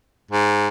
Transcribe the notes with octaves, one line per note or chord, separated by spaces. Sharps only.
G#2